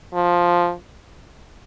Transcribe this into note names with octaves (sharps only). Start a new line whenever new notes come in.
F3